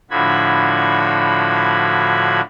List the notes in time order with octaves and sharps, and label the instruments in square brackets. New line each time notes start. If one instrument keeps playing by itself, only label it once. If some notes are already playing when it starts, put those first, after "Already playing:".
[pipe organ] A2 D3 F3 F#4 B5 G#6